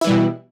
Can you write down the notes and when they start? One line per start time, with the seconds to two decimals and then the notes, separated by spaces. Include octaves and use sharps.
0.01 E4
0.04 E3
0.07 G3
0.10 B2